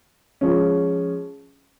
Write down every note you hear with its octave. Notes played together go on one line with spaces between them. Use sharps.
F3 G#3 C#4